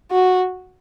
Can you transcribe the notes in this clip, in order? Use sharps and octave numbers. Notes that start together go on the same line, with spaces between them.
F#4